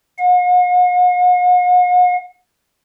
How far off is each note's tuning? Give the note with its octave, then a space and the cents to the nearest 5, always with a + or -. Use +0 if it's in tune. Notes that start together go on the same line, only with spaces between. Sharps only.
F#5 -45